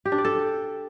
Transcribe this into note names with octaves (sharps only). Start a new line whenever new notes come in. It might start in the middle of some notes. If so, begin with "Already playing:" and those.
G4
D4
D5
A4